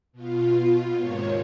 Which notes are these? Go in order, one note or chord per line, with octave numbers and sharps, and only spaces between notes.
B2 F4
D#2 G#2 C3 D#3 C#5